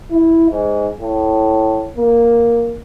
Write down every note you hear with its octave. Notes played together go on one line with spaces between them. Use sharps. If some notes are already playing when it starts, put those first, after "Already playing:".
E4
G#2
A2
A#3